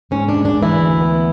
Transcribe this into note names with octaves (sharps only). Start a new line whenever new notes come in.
G#2 C#4
D4
G#3
D4
G#2
E3 E4
D2
B3